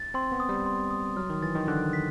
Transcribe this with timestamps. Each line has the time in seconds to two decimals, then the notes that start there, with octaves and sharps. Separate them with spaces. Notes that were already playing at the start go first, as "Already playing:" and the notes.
Already playing: A6
0.14 C4 C6
0.32 B3
0.40 D#6
0.49 G3
0.66 C6
0.91 D#6
1.16 F#3 F6
1.30 D#3
1.43 E3 A6
1.55 D#3
1.68 D3 F#6
1.93 B6